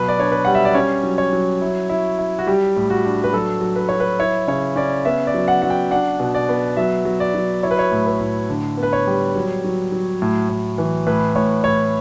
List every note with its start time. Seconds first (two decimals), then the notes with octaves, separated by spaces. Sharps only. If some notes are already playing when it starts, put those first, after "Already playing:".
Already playing: B2 F#3 B4
0.08 D5
0.18 D4 C#5
0.32 B4
0.45 G3 F#5
0.55 E5
0.65 D5
0.74 C#4 C#5
1.03 F#3
1.18 C#5
1.33 F#3
1.62 E4
1.89 E4
2.19 E4
2.39 F#4
2.47 G3 G4
2.76 A2
2.90 F#4
3.05 D4
3.24 B4
3.33 F#3 A4
3.61 F#3
3.76 B4
3.89 F#3 C#5
4.00 B4
4.19 E4 C#5
4.48 C#3 C#5
4.76 C#4 D5
5.05 B3 E5
5.27 D5
5.34 F#3
5.48 F#5
5.62 F#3 F#5
5.70 G5
5.91 D4 F#5
6.20 B2
6.34 D5
6.49 B3
6.77 F#3 E5
7.05 F#3
7.20 D5
7.34 F#3
7.63 E4 C#5
7.71 B4
7.79 C#5
7.91 A2
8.07 B4
8.21 A2
8.50 D3
8.77 B3
8.83 B4
8.93 C#5
9.07 G3
9.36 F#3
9.64 F#3
9.92 F#3
10.22 A2
10.49 A2
10.78 E3
11.07 A2 B4
11.35 A2 C#5
11.64 A2 C#5